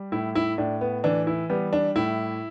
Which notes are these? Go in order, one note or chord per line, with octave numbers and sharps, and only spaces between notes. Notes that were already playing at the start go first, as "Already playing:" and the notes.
Already playing: G3
A2 E4
E4
A2 D4
B3
E3 D4
E4
G3 B3
D4
A2 E4